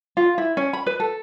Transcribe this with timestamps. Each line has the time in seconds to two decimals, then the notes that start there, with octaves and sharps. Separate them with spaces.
0.17 F4
0.38 E4
0.57 C#4
0.73 B5
0.86 B4
1.00 A4